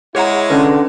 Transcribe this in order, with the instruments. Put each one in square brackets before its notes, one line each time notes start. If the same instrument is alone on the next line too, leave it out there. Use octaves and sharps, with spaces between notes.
[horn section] G#3 E4 C#5 [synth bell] G#4 F#5 A#5
[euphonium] D3 [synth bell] C#4 B4